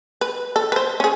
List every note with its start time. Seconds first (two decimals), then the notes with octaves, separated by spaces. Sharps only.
0.21 B4
0.56 A4
0.72 B4 C5
1.00 C#4 G#4